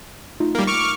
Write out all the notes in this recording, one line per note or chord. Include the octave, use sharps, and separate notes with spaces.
A3 D#4 F4
G3 A#3
C#6 D6 F6